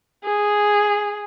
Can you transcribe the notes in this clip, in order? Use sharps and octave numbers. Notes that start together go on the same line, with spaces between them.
G#4